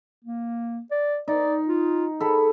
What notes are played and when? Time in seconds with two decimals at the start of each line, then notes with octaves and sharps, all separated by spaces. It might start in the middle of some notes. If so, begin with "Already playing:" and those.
0.25 A#3
0.91 D5
1.28 D#4 D5
1.68 F4
2.20 G#4 A4 B5